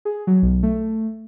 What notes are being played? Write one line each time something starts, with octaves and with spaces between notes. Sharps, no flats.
G#4
F#3
B1
A3